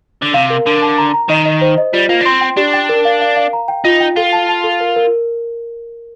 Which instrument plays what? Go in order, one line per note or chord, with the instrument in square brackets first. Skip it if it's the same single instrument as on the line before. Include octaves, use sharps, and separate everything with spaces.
[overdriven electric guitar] D3
[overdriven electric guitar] C3 [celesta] F5
[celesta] A#4
[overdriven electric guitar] D3 [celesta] A#4
[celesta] A5
A#5
A#5
[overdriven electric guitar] D#3 [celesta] D#5
[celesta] D#5
C5
D#5
[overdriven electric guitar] G3 [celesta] F4
[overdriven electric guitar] A#3 [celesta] F4
[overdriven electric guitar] D4
[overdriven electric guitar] C4 [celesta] C6
[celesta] G5
[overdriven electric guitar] D4 [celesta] G4
[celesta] G5
A#4
F5
F5
F5
A#5
G5
[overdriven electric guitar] D#4 [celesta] F4
[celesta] G5
[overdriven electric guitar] F4 [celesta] A4
[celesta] A5
A5
A4
A#4
A#4